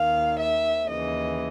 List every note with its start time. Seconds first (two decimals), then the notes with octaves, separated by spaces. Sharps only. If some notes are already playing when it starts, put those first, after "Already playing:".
Already playing: D#2 D#3 F5
0.38 E5
0.88 D#2 C#3 E3 D#5